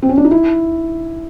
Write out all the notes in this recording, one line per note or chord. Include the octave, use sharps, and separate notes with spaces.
C4
C#4
D4
D#4
E4